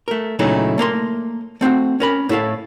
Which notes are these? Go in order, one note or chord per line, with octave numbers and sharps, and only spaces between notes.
A3 A#4
A#2 C#3 F#3 A3 D#4 E4
A3 A#3 A#4 C6
A3 C4 F4 F#4
C#4 A#4 B5
A2 E4 A4 F5